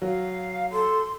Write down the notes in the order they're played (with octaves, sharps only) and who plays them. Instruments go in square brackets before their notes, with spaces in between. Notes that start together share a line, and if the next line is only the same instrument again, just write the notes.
[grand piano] F#3 [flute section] F5
[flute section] A4 [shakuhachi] C6